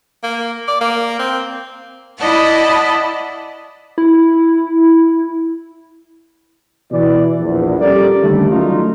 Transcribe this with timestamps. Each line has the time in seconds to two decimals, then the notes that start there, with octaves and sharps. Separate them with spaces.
0.23 A#3
0.68 D5
0.81 A#3
1.19 C4
2.17 E4 D5 D#5 F#5 A5
3.98 E4
6.91 B2 E3 D5
7.40 A#1 E2
7.81 G3 C#4 G4 A4 A#4 D5
8.22 D#2 D3 D#3 G3 A3
8.50 F#3 G3 A3 C#4 D#4 F4